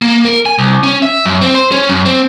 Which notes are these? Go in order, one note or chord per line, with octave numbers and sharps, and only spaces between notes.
A#3
A#4
G#5
C2
C#4
E5
F#2
C4
C5
C#4
F#2
C4